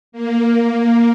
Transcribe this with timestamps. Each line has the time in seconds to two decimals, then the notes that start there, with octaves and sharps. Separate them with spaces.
0.12 A#3